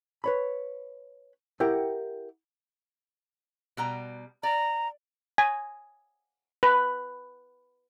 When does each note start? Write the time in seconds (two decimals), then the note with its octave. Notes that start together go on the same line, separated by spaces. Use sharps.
0.24 B4 C#5 B5
1.60 E4 G4 A#4 F#5 G5
3.77 B2 G3 A#5
4.43 D5 A#5
5.38 G#5
6.63 B4